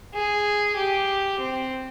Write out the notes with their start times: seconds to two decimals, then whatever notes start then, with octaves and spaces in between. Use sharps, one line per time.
0.14 G#4
0.76 G4
1.40 C4